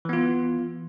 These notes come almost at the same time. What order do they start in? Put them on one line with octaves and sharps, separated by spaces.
E3 B3 F4